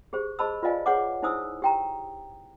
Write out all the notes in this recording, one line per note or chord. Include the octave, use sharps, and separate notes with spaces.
G4 G#4 C5
G#4 C5 D#5 A5 B5 E6
F4 B4 D5 D#5 F5 G#5
G#4 B4 C#5 F#5 G#5 D6
D#4 E4 C5 G#5 D#6 E6
G4 G5 A#5